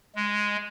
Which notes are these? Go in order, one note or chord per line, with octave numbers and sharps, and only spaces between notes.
G#3